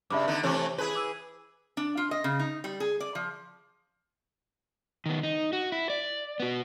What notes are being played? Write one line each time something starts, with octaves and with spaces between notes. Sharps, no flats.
G2 C#3 E5 B5 D6
D3 B3 D#4
C3 E3 A3 C#5 D6
E4 G#4 B4
D6 E6
D4
F4
D#5
C#3
D#4
G3
G#4
D5
F3
D#3 B3
D#4
F#4
E4
D5
B3 F#4